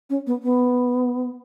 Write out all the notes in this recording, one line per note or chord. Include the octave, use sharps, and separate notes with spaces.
C#4
B3
B3